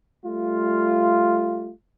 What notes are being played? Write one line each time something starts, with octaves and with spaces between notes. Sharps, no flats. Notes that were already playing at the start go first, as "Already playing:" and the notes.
G3 A3 F4